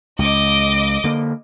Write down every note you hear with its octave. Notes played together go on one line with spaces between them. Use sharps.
C#2 D#5 D6
D3 A#3